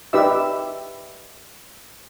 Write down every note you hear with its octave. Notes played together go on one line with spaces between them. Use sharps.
D#4 G4 B4 D5 E5 E6